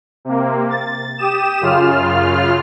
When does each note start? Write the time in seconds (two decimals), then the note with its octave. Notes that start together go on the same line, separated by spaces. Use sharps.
0.25 C3 A#3
0.70 A6
1.18 G4 D#6 E7
1.61 F#2 C#3 F4 F6